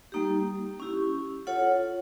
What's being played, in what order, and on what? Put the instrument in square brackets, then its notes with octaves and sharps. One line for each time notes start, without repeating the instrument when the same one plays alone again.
[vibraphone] G3 A#3 D#4 G4
C#4 E4 G4
F4 A4 C#5 F#5